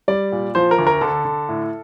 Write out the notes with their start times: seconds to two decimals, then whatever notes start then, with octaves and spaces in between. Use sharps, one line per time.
0.08 G3 D5
0.32 A#2
0.55 F3 C5
0.71 A#4
0.79 D2
0.87 A#4
1.01 D3 A4
1.25 D3
1.49 A2